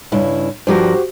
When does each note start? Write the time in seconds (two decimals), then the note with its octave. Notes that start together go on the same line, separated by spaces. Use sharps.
0.12 G2 C#3 E4
0.67 G2 F3 F#4 G4 A#4 C5